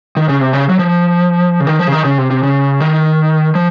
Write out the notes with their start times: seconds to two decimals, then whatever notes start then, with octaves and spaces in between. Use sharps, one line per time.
0.17 D#3
0.29 C#3
0.41 C3
0.53 C#3
0.69 F#3
0.79 F3
1.60 C#3
1.67 D#3
1.79 F3
1.87 C#3
1.92 D#3
2.04 C#3
2.18 C3
2.31 C3
2.43 C#3
2.80 D#3
3.55 F3